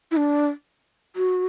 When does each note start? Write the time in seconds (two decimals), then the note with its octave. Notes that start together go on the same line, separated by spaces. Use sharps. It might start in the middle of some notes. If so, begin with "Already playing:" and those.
0.11 E4
0.17 D4
1.16 F#4